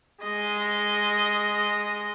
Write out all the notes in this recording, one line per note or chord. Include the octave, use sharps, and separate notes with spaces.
G#3 D#5